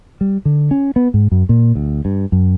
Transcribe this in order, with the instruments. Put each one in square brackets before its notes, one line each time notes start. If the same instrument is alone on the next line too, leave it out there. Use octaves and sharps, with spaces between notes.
[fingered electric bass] G3
D3
C#4
B3
G#2
F#2
A#2
D2
G2
F#2